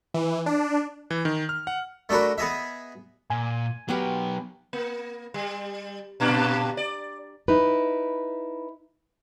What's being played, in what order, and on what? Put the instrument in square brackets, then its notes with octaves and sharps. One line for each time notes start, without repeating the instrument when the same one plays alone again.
[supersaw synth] E3
D4
[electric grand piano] E3
D#3
F6
F#5
[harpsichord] A3 D4 F#4 A#4 B4
B3 G#4 D#5 E5
[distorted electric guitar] A#2 [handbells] G#5
[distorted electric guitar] F#3 B4 [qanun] B3 G4 A#4
[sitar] A#3
G3
G2 A#2 D4
D5
[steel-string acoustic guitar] D#4 E4 B4